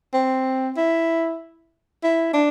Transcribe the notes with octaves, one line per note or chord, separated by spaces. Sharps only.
C4
E4
E4
D4